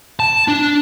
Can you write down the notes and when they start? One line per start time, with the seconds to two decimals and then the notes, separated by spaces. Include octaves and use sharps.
0.20 A5
0.48 D4